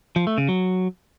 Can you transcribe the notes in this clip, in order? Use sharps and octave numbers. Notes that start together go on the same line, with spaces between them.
F3
A3
C#3
F#3